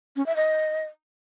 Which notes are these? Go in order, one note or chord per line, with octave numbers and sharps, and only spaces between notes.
C#4
E5
D#5